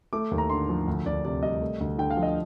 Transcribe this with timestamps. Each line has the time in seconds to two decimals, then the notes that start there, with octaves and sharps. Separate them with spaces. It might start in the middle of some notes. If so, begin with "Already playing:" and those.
0.13 A3 D6
0.31 D#2
0.38 A#5
0.50 D3 C6
0.69 F3
0.88 D2
1.05 D2 D5
1.24 C3 D5
1.43 G3 D#5
1.61 A3
1.80 D2
1.98 D3 G5
2.10 F5
2.17 F3
2.23 D#5